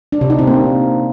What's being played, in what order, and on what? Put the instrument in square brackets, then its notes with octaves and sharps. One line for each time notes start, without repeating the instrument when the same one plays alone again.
[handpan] D4
C3
D#4
C4
A#3